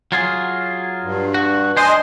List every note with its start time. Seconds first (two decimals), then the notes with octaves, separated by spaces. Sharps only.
0.12 F#3 F4 G#4
1.04 G2
1.34 F#4
1.77 D4 C5 D#5 G#5 C6